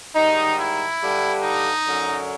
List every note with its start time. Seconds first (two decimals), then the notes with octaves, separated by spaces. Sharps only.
0.15 G#2 D#3 G3 D#4
0.59 E4
1.01 G2 D3 G3
1.43 D#4
1.86 F#2 D3 F#3